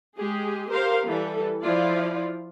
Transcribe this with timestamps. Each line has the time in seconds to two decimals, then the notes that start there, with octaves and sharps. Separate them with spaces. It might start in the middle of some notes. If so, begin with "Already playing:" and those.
0.17 G#3 G4 G#4
0.70 G4 A#4 C5 F5
1.07 E3 G3 A4
1.63 F3 E4 F4 D5